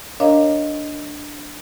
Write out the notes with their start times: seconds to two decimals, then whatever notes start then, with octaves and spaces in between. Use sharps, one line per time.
0.20 D4 A#4 C#5 D#5 F5 A#5